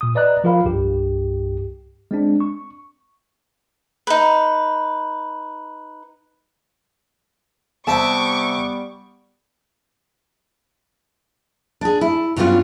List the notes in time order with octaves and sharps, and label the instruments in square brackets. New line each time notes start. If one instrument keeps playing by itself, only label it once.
[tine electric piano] A#2 D#6
B4 D5 D#5 A#5 F#6
F3 F4 A#4 F5 B5
C2 G2 G4
G#3 C4 D4
C#6
[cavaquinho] D#4 B4
[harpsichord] C3 E5 [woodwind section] G3 B3 [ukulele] A5 [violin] C#6 D6
[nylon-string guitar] D4 G#4
E4
G2 F#3 G3 B3 C#4 F4